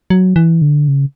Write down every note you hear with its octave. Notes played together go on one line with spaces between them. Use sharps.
F#3
E3
D3
C#3